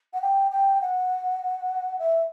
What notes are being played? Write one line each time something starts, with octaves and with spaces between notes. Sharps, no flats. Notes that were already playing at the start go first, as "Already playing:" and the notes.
F#5
G5
G5
F#5
E5